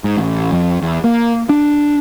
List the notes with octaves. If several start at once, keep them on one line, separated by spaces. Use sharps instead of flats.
G#2
A1
F2
E2
A#3
D4